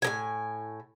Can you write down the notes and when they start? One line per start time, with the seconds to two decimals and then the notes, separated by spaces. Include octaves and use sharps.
0.02 A2 A#3 G#5